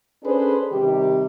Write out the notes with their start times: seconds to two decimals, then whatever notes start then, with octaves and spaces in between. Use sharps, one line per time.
0.23 C#4 D4 G#4 A4 B4 C5
0.71 C3 D#3 G3 G4